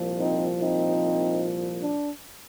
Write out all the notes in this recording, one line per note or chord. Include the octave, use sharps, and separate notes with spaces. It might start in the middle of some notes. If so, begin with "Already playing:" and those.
Already playing: C2 A#2 F3
C4 D#4
C4 D#4
D4